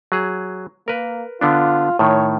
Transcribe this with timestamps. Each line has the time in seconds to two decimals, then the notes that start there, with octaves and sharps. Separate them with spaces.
0.12 F#3 G#4
0.88 A#3 A#4 B4
1.41 D3 B3 D4 F4
1.99 A2 D#3 C#5